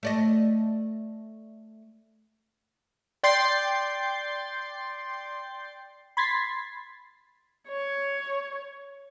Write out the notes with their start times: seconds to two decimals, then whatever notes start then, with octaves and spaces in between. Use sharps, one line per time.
0.03 A3 D5 D#5
3.23 D5 G5 C6 G6 A6 C7
6.17 B5 C6 G#6 A6 B6 C7
7.69 C#5